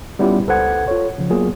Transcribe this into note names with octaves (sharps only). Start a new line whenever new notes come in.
G3 B3 C#4 E4 F4 G4
C#2 A4 B4 C5 F#5 G#6
F4 A4 C#5
C#3 F3
F#3 A#3 B3 F4 G#4